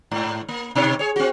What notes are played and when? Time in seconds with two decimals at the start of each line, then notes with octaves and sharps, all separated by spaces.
0.11 G#2
0.49 A#3
0.75 B2 D#4 C#5
0.99 G#4 C#5
1.16 C4 F#4